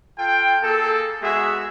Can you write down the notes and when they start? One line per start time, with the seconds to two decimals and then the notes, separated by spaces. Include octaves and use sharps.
0.18 F4 A4 G5
0.62 A#3 G#4 A4
1.22 G#3 B3 F#4 G#4 E5